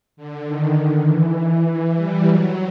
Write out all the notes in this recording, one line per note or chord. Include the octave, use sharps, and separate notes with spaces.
D3
D#3
E3
G3
F#3